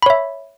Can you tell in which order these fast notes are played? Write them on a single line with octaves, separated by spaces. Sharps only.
B5 C#5 E5